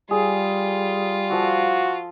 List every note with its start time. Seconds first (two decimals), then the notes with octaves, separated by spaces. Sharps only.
0.11 G3 F4 G#4
1.31 F3 F#4 A4 E6